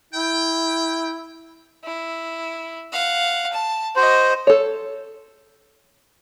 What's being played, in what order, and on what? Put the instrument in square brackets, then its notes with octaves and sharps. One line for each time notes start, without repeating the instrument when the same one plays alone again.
[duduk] E4 [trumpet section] G5
[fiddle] E4
F5 F#5
A5
[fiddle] F#4 D#5 [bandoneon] C5
[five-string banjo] A4 C#5